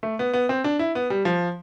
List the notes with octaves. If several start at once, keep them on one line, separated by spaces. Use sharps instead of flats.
A3
B3
B3
C4
D4
E4
B3
G3
F3